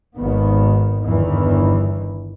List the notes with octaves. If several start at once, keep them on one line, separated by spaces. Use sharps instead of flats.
G#1 D#3 B3
G1 E2 D#3 E3